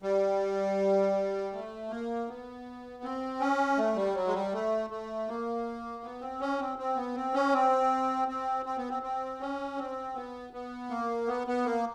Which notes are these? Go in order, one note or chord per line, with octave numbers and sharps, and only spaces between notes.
G3
A3
A#3
B3
C4
C#4
A3
G3
F#3
G#3
G3
A3
A3
A#3
B3
C4
C#4
C4
C4
B3
C4
C#4
C4
C4
C4
B3
C4
C4
C#4
C4
B3
B3
A#3
B3
B3
A#3